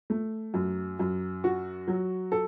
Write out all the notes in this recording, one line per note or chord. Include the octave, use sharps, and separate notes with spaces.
A3
F#2
F#2
F#4
F#3
A4